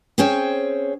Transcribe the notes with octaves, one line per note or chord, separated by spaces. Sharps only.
C4 C#4 G#4 C5 C#5 G5